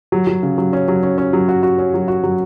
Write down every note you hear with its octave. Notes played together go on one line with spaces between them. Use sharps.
F#3
F#3
C#3
F#3
C#4
F#3
C#4
C#4
F#3
F#4
F#4
C#4
F#3
F#4
F#3